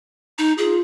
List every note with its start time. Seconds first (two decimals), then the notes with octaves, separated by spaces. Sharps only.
0.38 D#4
0.58 F4 G#4